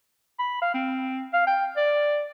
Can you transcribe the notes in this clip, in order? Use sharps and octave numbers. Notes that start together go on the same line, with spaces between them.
B5
F5
C4
F5
G5
D5